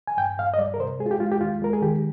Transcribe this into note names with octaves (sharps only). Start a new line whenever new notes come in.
G#5
G2 G5
G2 F5
D#5
G3 D5
A#4
C3 C5
G#3 G#4
F4
G4
G#3 F4
G4
D#2 F4
G#3 A#4
G#4
D#3 G4